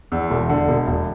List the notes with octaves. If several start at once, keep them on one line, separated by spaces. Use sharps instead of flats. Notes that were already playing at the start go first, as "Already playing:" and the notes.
E2
E1
D3
E1
E1